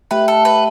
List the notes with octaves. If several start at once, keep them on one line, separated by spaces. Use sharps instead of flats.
A3 G4 B4 E5 G5
A4
B4